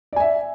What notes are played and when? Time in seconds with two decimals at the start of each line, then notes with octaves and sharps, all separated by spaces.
0.13 D5
0.16 G#5
0.20 E5